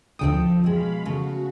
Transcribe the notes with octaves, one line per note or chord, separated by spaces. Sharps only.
D2 D3 F3 C4 A4 G5 D#6
B2 G#3 F5 B5
C#3 A3 F#4